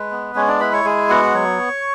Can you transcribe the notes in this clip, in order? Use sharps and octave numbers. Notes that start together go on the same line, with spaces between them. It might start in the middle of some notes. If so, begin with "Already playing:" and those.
Already playing: G#3 B4
B3
G#3 C#4 C#5
D4 D5
E4 B4 B5
C#5 C#6
G#3 G#4 G#5
B3 F#4 F#5
F#3 C#5 C#6